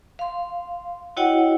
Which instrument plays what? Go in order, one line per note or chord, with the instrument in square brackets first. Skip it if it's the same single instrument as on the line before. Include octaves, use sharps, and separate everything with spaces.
[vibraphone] F5 C6
E4 F#4 C#5 D#5 F#5 G5